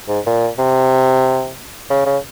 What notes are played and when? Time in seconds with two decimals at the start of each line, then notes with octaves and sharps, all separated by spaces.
0.08 G#2
0.26 A#2
0.58 C3
1.90 C#3
2.06 C#3